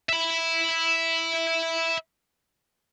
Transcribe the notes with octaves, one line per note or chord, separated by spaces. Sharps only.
E5 B5